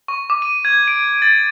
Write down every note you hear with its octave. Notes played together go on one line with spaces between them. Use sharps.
C#6
D6
D#7
G#6
D7
A6